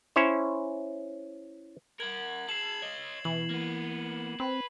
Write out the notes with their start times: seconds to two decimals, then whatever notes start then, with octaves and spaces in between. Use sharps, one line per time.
0.16 C#4 E4 C5 C#5
2.00 A#4 F#5 G#6 F#7
2.49 G#4 A5 C7 E7 F#7
2.82 C#5 D#5
3.25 B2 E3 F#7
3.50 A#3 B3
4.40 C4 B4